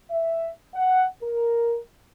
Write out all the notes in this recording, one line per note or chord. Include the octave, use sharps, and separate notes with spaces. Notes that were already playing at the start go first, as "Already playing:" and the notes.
E5
F#5
A#4